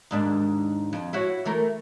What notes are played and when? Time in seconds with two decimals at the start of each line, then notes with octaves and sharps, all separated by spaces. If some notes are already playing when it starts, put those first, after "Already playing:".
0.11 D#2 G#2 D4
0.93 F2
1.13 E4 F#4 C#5
1.45 E3 A3 A#4